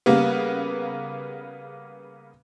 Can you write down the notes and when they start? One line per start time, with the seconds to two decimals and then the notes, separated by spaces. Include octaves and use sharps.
0.06 C#3 G3 A#3 B3